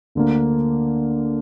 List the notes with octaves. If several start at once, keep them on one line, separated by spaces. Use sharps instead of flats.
D2 D3 A#3